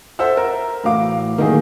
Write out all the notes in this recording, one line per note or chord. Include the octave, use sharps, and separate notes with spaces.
A4 C5 E5 F#5 E6
A#4
A2 E3 F#4 F5 D6
D#3 F#3 A3 A#3 G#4